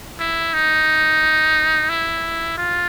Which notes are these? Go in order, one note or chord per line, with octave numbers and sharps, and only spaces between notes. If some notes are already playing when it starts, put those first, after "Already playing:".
E4
D#4
E4
F4